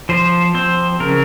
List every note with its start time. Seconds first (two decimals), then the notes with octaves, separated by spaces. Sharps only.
0.09 F3 C5
0.54 C4 C5
1.00 C#3 A#4